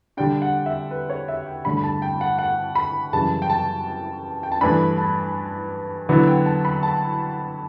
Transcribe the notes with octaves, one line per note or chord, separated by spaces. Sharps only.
D3 G3 D4 G5
F#5
E5
B4
C#5
E5
G5
G2 D3 A3 B5
B5
A5
G5
F#5
F#5
B5
F#2 C#3 E3 G3 A5
G5
A5
G5
A5
G2 E3 A3 D4 B5
A5
D3 F#3 B3 E4
G5
A5
B5
A5